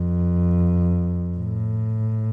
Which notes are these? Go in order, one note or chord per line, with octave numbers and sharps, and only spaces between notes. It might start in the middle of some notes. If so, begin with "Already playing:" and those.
Already playing: F2
A2